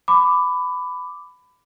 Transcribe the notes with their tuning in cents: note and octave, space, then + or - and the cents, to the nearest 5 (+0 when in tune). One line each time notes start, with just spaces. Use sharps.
B5 +15 D6 +0